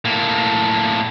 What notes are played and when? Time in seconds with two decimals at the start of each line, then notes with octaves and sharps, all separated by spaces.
0.05 A2 A#3